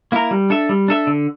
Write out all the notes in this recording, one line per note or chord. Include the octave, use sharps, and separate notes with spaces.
A#3 E4 A#4
G3
D4 A4 E5
G3
D4 A4 E5
D3